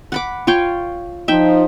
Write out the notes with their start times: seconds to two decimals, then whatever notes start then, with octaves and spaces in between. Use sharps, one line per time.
0.12 F#5 B5 D6
0.47 F4 C#5 G5
1.28 F3 D#4 E5 G5